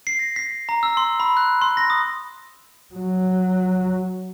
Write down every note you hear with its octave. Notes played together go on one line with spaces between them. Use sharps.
C7
A#6
B6
A#5
E6
C6
B5
F#6
C6
A#6
D#6
F#3